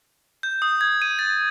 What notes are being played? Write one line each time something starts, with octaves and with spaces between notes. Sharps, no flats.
G6
D#6
G#6
D#7
A6